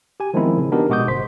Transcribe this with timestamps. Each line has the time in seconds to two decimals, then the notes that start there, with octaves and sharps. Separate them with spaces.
0.20 G4 G#5
0.34 D#3 F3 G#3 B3 C4 E4
0.58 C#3
0.72 B3 D4 D#4 F#4 G4 A#4
0.90 B2 G#3 F#4 D6 D#6 G6
1.08 G1 C5 C6 B6